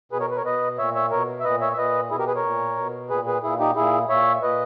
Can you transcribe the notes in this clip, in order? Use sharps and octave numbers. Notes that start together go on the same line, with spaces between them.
B2 G#4 B4
A#4 C#5
B4
A#4 C#5
B2 B4 D#5
A#2 C#5 E5
C#5 E5
B2 A#4 C#5
E5
A#2 B4 D#5
C#5 E5
E5
A#2 B4 D#5
B2 E4 G#4
G4 A#4
G#4 B4
A#4 C#5
A#2
B2
A#2 G#4 B4
G#4 B4
A#2 E4 G#4
D#4 G4
A#2 E4 G#4
A#2 C#5 E5
A#2 B4 D#5